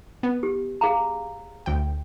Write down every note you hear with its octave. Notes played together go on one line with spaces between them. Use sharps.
B3
G4
G#4 F5 A#5
D2 G5